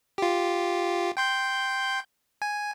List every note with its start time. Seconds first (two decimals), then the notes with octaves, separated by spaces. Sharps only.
0.18 F4 G4
1.17 G5 C6 G6
2.42 G#5